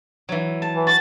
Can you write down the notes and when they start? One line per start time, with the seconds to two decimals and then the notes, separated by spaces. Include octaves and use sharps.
0.29 E3 F#3
0.62 A5
0.74 E3
0.87 F#4 A6